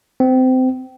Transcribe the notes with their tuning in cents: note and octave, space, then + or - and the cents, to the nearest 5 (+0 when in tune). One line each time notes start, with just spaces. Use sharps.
C4 -25